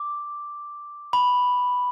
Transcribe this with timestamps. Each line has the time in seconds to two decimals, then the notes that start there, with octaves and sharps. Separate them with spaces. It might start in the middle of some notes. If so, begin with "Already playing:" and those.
Already playing: D6
1.13 B5